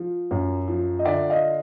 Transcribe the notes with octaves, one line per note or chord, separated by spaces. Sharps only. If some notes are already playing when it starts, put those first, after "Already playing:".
Already playing: F3
F#2
F3
D#5
D3 D5 E5
D#5 F5